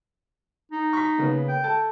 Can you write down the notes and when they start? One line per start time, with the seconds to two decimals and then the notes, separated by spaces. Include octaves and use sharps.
0.72 D#4
0.93 C#6 B6
1.18 C#3 A#3 B3
1.48 G5
1.64 A4 A5